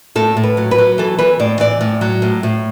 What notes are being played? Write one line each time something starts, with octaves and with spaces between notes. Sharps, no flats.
A2 A4
A2
B4
F#3
B4
F#3
E3 A4
E3 B4
A2 D5
E3 D5
A2
F#3
A2
A2